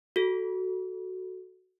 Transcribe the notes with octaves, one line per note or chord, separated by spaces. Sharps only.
F#4 A4